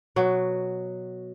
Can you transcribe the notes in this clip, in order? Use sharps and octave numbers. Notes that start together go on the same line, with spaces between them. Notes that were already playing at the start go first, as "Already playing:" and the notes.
B2 F#3